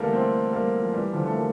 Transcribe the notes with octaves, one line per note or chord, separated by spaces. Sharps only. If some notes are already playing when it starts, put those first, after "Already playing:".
Already playing: D3 E3 G3 A3 A#3
A3 C4
G3 A#3
F3
E3 G3
D3 F3
A3
G3 A#3